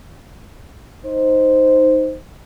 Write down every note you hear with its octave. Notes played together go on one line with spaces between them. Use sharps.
D#4 C5